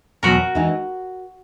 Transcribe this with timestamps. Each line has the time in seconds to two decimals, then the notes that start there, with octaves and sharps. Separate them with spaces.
0.23 E2 B2 F#3 F#4 A#4
0.55 E3 G#3 D#4